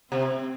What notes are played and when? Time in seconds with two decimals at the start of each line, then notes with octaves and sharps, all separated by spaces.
0.11 C3 C4